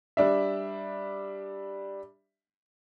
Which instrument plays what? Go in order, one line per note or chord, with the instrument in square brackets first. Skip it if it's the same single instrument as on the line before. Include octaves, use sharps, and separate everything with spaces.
[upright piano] G3 D4 E5